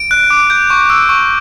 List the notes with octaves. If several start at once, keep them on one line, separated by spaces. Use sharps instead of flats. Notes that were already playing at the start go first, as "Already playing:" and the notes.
Already playing: D7
F#6
D6
G6
C#6
E6
C#6